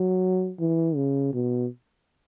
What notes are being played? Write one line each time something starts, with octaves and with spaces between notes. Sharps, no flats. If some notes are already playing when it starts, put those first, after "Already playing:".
Already playing: F#3
E3
C#3
B2